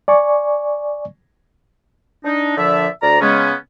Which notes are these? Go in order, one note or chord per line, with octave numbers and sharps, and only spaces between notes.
D5 G#5 C#6
D4 D#4
A#2 D3 F3 D5 E5
D2 D5 A#5
C#3 G#3 B3 C#4